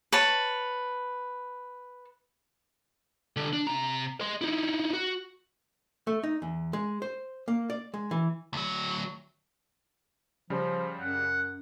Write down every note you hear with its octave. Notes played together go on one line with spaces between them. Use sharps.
B4 C#5 A5
D3 G3
D4
C3 A#5
D#5 C6
D#4 E4
F#4
A3
D#4
E2
G#3
C5
A#3
D5
G#3
E3
D2 F#3
C#3 F3 G3
F#2 F#5